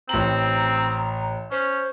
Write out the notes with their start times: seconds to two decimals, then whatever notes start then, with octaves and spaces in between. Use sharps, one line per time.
0.09 A1 C4 A#5 F#7
1.52 C#4 C5